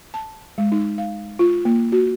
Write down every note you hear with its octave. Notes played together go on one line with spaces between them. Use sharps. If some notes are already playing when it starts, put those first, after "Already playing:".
A5
G#3
D#4
F5
F4
A#3
F#4